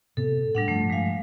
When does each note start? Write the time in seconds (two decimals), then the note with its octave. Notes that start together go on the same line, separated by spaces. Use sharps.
0.17 A2 C3 B3 A4
0.55 A2 G3 D4 F#5
0.68 G2 F3 A3
0.90 G#3 F5